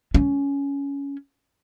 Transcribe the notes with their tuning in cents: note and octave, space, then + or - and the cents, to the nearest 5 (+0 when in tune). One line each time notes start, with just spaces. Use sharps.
C#4 +15